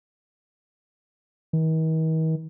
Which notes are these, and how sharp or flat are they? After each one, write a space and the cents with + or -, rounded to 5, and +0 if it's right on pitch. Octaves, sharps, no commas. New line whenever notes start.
D#3 +45